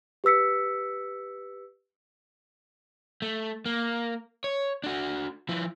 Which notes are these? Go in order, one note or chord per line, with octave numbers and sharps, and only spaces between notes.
G4 B4 E6 B6 C#7
A3
A#3
C#5
D4 F#4
F3 E4